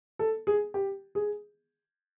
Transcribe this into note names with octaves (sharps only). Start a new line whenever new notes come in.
A4
G#4
G4
G#4